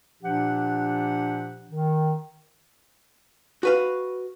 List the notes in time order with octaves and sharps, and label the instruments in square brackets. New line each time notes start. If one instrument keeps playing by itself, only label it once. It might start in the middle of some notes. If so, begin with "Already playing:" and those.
[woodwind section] A#2 F3 D4 G4 F#5
D#3
[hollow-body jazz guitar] F#4 B4 F5